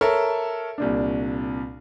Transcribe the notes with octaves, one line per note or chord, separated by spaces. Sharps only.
A4 A#4 C#5 E5
C2 A#2 D4